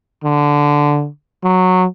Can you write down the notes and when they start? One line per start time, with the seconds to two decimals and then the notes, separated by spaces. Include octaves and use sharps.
0.24 D3
1.44 F#3